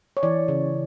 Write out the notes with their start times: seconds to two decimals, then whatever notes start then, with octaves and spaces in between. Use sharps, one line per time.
0.17 C#5
0.23 E3 D5
0.48 C#3